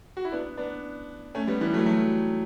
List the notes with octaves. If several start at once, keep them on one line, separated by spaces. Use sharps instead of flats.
F#4
E4
B3 D4
B3 D4
A3 C#4
G3 B3
E3 G3
F#3 A3
F#3 A3